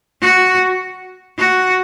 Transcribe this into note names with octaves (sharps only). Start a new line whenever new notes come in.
F#4
F#4